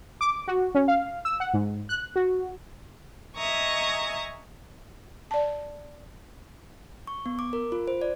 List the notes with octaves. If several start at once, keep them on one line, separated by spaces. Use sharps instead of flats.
D6
F#4
C#4
F5
E6
F#5
G#2
F#6
F#4
D#5 E5 G#5 A#5 C#6 D#6
D5 A5
C#6
B3
D6
A#4
F4
C5
D5